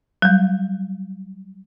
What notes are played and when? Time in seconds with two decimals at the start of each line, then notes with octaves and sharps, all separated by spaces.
0.22 F#3 G3